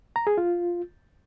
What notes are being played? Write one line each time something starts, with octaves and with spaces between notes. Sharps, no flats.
A#5
G#4
F4